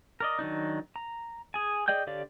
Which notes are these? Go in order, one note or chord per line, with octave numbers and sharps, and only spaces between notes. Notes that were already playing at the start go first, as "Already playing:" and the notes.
A#4 D5 D#5
D#3 F#3 D4 D#4
A#5
G#4 G#5
G#4 D5 D#5 G5 G6
D3 G4 C#5 D5 F5